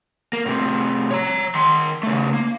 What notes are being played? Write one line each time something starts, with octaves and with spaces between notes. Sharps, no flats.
A#3
A2 C3
C#5 A#5
D#3 C6
C#3 A3
A#3